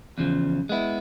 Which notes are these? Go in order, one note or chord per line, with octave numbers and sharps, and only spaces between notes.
E2 C#3 F3
G#3 B3 E4